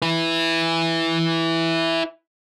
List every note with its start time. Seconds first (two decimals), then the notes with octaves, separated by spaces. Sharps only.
0.02 E4 B4